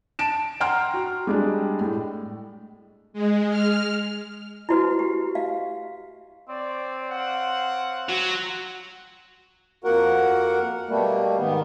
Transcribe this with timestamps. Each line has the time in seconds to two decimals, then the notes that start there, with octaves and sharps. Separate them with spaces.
0.19 A5 D7 E7
0.60 F#5 G5 A#5 C6 F6
0.94 F#4
1.27 G3 G#3 D4
1.80 A2
3.13 G#3
3.50 F6
4.69 E4 F#4 B4
4.99 G4
5.35 F5
6.49 C4 C#5 D5
7.10 C#5 F5 F#5
8.09 F#3
9.84 F2 A#3 F#4 A#4 F#5
10.89 B2 G3 A3 A#3
11.39 G#2 D#3 B3